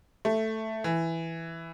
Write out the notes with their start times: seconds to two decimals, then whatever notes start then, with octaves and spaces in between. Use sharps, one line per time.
0.25 A3
0.84 E3